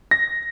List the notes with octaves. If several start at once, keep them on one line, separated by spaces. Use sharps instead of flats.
A#6